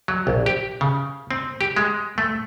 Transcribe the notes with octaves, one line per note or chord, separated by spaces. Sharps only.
F#3
A#1
G4
C#3
C4
G4
G#3
A3